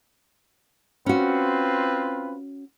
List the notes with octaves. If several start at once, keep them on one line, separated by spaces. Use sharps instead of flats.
C4 C#4 F4 F#4 B4